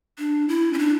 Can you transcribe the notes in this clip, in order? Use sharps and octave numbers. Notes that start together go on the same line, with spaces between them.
D4
E4
C#4
D4